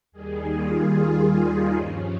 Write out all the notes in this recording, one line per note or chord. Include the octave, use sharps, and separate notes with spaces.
D#2 D#3 G3 G#4
F4
D#4
G2 F3 C#4